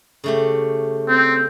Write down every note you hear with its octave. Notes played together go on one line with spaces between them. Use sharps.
C#3 A3 G4
C4